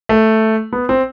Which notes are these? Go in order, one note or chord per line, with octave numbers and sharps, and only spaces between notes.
A3
B3
C4